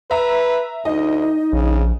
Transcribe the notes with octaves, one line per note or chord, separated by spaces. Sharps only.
B4 E5 A#5
D2 D#4 D#5
A#1 C#3